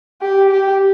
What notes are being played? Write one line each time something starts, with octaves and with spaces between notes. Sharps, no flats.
G4
G4